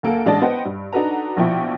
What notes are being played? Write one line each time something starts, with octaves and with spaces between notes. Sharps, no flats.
D2 A#3 A4
A1 G#3 D4 D5 D#5 A5
B3 C5 D#5 F#5 G5
G2
D4 D#4 F#4 A4 B4 A#5
A#1 B2 F3 E4 G5 C#6